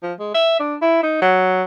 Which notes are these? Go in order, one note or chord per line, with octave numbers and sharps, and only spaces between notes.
F3
G#3
E5
D4
E4
D#4
F#3